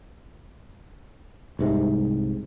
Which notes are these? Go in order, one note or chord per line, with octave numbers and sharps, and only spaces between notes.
C2 G#2 C3